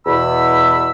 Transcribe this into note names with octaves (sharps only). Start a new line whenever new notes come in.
E2 B2 B5 E6